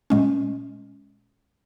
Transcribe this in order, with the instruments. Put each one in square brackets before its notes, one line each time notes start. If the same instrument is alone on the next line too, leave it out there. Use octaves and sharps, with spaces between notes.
[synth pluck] A#2 G#3 C#4